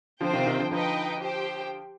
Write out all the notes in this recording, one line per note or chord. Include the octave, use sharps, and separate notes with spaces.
D3 F3 C4 F4 C5 G5
C3 D#3
C3 D#3
D3 F3
D3 F3 D#4 B4 D#5 G5
G4 C5 G5